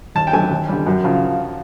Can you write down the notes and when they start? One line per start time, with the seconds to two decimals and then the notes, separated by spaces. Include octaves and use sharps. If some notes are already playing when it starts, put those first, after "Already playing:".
0.15 D#2 A5
0.27 G5
0.33 D3 F#3 A3 G#5
0.50 D#2
0.68 D3 G3
0.87 F#2
1.04 C#3 F3